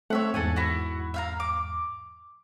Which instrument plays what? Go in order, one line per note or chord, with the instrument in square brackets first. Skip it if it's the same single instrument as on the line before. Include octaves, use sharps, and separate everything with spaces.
[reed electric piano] A3 C4 [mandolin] C#5 E5 F#5
[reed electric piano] E2 G#2 [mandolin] A4 F#5 G#5
[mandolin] E4 F#4
E5 F5 A#5
D6